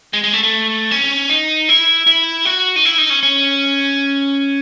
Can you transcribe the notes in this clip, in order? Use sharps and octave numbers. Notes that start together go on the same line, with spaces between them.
G#3
G#3
A3
A3
C#4
D#4
E4
E4
F#4
D#4
E4
D#4
C#4
C#4